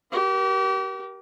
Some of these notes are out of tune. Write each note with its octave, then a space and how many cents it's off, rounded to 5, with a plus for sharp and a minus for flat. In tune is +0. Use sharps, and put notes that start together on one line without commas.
G4 -35 A#4 +30